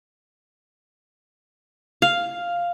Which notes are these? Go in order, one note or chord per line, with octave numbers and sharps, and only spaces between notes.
F5